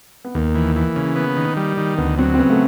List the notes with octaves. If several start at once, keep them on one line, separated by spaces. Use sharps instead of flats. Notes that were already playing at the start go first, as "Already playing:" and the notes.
B3
D#2 A#3
E3
E3
C#3
B3
D#3
G3
D#3
D2 B3
F#3 C4
C4
C#3 B3
A3